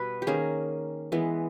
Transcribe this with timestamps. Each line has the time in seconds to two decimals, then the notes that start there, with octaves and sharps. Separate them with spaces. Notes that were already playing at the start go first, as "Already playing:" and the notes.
Already playing: B2 G3 B3 B4
0.22 G4
0.27 D#3 A#3 C#4 G#4
1.12 E3 G#3 B3